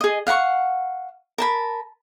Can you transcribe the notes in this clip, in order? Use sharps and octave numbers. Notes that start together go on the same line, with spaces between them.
G#4 D#5
F5 F#5 A#5 C#6
A#4 A5 B5